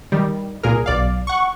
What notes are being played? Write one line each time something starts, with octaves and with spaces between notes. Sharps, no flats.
D#3 G3
C2 A#2 G#4 A#4
B1 D5 F5
F#5 C#6